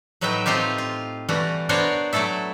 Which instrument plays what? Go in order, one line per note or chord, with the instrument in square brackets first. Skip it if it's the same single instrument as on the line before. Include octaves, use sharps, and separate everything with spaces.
[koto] A2 F#3 D#4 B4 E5 G5
A3 C4 D#4 F4 G4
F4
E3 G3 A3 F#4
B3 D4 F#4 A#4 C5 C#5
F#3 A3 E4 A4 E5